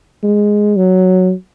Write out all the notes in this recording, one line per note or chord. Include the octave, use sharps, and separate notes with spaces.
G#3
F#3